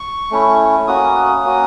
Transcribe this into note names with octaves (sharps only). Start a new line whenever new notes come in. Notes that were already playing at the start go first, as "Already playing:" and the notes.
Already playing: C#6
A3 C#4 E4
A#3 C#4 F#4 D#6
A#3 C#4 F#4